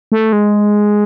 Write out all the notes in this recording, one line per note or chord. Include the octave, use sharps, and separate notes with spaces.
A3
G#3